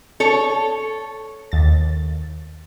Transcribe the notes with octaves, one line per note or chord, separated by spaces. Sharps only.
A4 C#5
D#2 A6